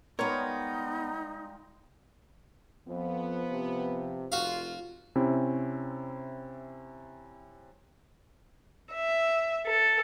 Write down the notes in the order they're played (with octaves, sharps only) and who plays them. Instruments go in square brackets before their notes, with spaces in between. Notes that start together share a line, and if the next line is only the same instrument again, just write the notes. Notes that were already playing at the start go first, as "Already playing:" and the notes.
[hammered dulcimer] G3 G#3 F4 [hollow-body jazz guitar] B3 A#4 [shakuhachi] D#4 [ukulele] C#5
[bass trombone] F2 [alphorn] F3 [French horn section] B3
[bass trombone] C3
[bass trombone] F1 [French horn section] F4 [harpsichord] F#4 F5
[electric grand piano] C3 C4 C#4 E4
[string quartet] E5
A4